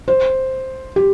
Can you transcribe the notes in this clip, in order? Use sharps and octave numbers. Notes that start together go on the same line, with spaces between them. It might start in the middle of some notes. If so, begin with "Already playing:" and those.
C5
G4